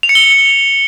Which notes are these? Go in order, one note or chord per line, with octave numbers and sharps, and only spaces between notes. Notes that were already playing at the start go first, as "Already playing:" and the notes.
F7
C#7
G7